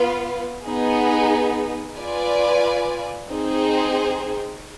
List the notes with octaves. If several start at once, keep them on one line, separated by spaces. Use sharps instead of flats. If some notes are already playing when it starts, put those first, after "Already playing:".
Already playing: B3 F4 B4 F5
B3 D#4 G#4
F4 B4 D5 G#5
C4 D#4 G#4 C5